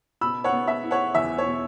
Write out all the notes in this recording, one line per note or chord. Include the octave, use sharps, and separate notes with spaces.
B2 B5 E6
C#5 F#5
B3
E5
E4
C#5 F#5
E2 E5
C#5
B2